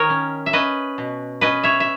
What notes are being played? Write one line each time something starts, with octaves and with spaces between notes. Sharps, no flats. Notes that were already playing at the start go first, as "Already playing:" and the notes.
Already playing: D#3 A#4 C#5 D#5
C#4
E5
C#4 B4 D#5
B2
C#4 B4 D#5
C#5 E5
E5